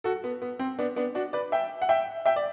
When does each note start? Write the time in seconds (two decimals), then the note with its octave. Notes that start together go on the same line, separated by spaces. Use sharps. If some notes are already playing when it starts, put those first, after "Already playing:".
0.04 F#4 A4
0.24 B3
0.42 B3
0.59 C4
0.79 B3 D4
0.96 B3 D4
1.15 D4 F#4
1.33 B4 D5
1.52 E5 G5
1.82 F#5
1.89 E5 G5
2.26 E5 G5
2.36 D5